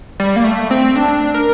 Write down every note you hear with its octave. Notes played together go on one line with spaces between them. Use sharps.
G3
A#3
A3
C4
D4
A#4